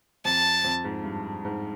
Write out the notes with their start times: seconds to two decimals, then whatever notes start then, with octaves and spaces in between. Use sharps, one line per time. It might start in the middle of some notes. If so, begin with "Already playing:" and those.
0.25 F2 A5
0.64 F2
0.84 G#2
1.04 G2
1.45 G#2